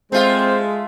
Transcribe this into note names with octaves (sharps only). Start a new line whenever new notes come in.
G#3 A3 C4 F4 C5